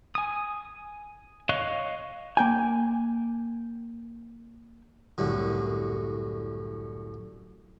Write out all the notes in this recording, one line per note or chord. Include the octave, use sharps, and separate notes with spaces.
G#5 D#6
C#5 D#5 F5 C#6 F#6
A#3 G5 G#5
C2 F#2 A2 D3